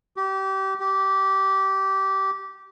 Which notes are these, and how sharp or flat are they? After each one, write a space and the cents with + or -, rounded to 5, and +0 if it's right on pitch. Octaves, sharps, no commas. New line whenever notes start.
G4 -25
G4 -15